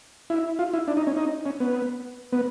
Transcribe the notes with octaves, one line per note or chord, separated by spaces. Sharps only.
E4
F4
E4
D4
D#4
C#4
D#4
C#4
B3
B3